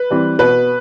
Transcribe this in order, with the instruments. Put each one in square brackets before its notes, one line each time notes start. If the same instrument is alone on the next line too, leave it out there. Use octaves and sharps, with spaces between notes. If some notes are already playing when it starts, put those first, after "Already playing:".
Already playing: [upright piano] B4
E3 G3 C4
B2 B4